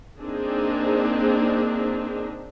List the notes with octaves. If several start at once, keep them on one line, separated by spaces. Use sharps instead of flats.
A#3 C4 D4 D#4 G#4